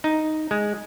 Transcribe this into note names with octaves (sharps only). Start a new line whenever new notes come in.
D#4
G#3